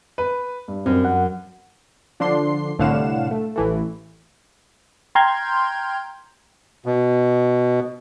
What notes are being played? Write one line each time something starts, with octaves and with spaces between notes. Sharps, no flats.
B4
G2
F#2 C4
F#5
D3 F3 D4 C6 C7
C2 A2 D3 F5 F#5 E7
A3
A1 E3 A3
G5 A#5 C6 F6 G6 G#6
B2